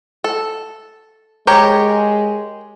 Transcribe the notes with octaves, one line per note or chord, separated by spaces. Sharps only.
A4
G#3 G4 A#4 C#5